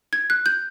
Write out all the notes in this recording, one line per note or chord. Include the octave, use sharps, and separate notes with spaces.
G#6
F#6
G6